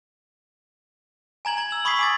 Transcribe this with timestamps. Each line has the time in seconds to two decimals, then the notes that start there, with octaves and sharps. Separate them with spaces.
1.45 G#5 A#5 G#6 F#7
1.57 A#5 G#6
1.71 E6 F#7
1.85 B5 C#6 D#6 G#6 B6 C7
1.99 G#5 D6 A6